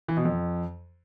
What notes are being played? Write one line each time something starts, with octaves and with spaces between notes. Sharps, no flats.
E3
B2
F2